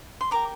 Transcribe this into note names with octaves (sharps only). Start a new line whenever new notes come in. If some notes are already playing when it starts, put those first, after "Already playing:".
C6
G4 A#4 D5 A#5 D6